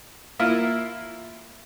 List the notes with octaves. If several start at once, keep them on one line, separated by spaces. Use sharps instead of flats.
A#3 E4 F4